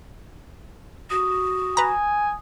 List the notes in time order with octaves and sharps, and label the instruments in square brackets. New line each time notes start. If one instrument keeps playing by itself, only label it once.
[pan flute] F#4 [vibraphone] D#6
[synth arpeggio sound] B4 A#5 [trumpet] G#5